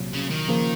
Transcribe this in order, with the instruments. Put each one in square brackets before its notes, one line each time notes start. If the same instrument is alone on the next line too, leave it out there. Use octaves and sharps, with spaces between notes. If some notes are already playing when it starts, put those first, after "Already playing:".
Already playing: [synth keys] C2 A#2 F#3
[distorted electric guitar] C#3
D#3
[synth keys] C#3 F3 A#3